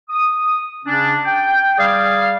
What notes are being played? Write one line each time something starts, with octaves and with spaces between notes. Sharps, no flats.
D#6
C#3 C#4 D4
G5
G3 G#4 D5 F5